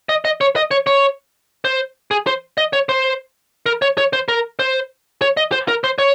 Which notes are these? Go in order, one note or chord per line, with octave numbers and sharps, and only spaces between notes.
D#5
D#5
C#5
D#5
C#5
C#5
C5
G#4
C5
D#5
C#5
C5
A#4
C#5
C#5
C5
A#4
C5
C#5
D#5
C5
A#4
C5
C#5